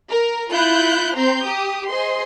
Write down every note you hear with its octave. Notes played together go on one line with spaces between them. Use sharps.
A#4
E4 F4 F#6 G6
C4 A#5 C6 G6
G4 D#6
G#4 C5 D#5 C6